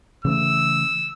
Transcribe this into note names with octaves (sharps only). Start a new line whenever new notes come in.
C#3 E3 A3 E6